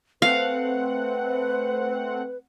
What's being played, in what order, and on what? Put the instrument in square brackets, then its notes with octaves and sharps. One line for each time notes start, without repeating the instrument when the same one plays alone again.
[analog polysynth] A3 C4 F#5 [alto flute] B4 [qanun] F5